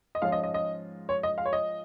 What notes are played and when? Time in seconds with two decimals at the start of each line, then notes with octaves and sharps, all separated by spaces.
0.15 D#5
0.22 G#2 F3 G#3 C#4 F4 F5
0.32 D#5
0.43 D#5
0.54 D#5
1.09 C#5
1.23 D#5
1.38 F5
1.45 C#5
1.53 D#5